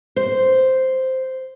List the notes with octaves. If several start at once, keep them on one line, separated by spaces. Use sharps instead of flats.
C5